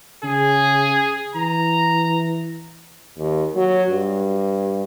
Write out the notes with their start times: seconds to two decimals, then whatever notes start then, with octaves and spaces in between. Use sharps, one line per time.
0.24 C#3 G#4
1.35 E3 A#5
3.18 D#2
3.56 F#3
3.90 G2